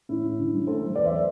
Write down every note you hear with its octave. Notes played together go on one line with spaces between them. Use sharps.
A2 E4
A2
D3
G3
A3 A4 C5
F#3
E2 B4 D5
C5 E5
B4 D5